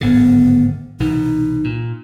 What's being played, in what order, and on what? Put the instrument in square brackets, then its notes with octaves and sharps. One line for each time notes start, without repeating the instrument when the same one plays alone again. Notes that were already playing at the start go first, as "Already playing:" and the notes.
[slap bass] D1 G#1 D3 [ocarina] B3
[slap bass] C2 B2 E3 [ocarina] D#4
[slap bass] A#2